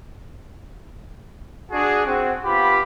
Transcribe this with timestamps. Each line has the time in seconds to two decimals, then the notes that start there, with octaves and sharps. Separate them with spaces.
1.71 D4 F#4 G#4
2.06 C4 F#4
2.44 B3 F4 G4 B5